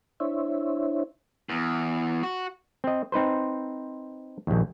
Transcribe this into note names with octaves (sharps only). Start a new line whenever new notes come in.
D4 E4 C5 C#5 E5
E2
F#4
C4 D#5
C4 D#4 B4 C5
A#1 D#2